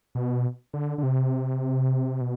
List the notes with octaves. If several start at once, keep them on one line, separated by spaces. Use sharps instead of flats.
B2
D3
D3
C3
B2